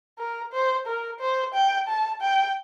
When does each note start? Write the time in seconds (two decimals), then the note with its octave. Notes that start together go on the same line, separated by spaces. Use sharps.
0.18 A#4
0.52 C5
0.87 A#4
1.20 C5
1.54 G5
1.88 A5
2.22 G5